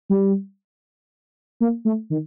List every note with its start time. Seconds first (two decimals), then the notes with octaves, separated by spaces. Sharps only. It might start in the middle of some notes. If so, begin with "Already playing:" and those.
0.10 G3
1.61 A#3
1.85 A3
2.10 D#3